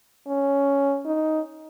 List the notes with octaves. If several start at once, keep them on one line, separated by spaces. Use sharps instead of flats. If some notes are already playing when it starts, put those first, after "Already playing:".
C#4
D#4